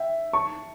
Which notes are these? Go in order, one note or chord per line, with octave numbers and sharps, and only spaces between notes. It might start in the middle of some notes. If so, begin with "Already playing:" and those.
Already playing: E5 G5
A5 C#6